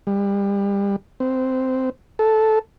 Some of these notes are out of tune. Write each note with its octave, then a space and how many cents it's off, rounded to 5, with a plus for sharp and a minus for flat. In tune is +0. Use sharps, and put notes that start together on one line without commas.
G3 +30
C4 -10
A4 -10